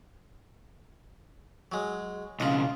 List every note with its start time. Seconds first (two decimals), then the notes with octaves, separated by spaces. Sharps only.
1.72 F#3 G#3
2.40 B1 C#3 F4 D#5